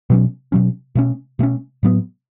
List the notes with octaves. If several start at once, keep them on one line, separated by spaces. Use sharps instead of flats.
B2 F#3 C#4
B2 F#3 C#4
B2 A3 C#4
B2 A3 C#4
A2 F#3 B3